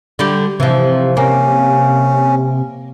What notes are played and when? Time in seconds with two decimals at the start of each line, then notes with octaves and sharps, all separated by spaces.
0.19 D3 G3 G4
0.60 C3 E3 F3
1.17 A#3 C#4